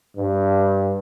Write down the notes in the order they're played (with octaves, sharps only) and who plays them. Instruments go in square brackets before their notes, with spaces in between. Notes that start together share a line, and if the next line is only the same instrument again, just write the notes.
[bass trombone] G2